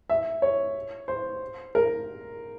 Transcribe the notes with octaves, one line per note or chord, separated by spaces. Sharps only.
E5
C#5
C5
A#4